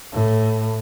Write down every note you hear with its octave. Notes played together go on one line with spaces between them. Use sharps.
A2